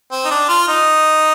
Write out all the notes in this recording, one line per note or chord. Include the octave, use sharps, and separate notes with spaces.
C4
D#4
D4
F4
D#4